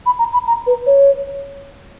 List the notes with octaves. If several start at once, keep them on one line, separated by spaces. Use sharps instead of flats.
B5
A#5
B5
A#5
B4
C#5